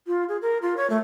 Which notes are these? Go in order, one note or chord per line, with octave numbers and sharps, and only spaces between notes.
F4
G#4
A#4
F4
C#5
A3